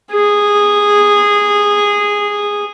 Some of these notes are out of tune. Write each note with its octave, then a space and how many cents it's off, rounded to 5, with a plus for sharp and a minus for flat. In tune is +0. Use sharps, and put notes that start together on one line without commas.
G#4 -10